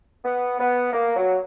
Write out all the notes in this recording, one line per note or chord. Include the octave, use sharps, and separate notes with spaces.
B3
B3
A#3
F#3